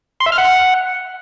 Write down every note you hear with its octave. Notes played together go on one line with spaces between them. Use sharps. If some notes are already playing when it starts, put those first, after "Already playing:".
C6
E5
F6
F#5